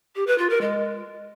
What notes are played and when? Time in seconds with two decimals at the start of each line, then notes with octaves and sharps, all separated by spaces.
0.16 G4
0.27 B4
0.38 F4
0.50 A#4
0.61 G#3